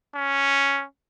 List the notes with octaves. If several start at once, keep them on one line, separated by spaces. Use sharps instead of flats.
C#4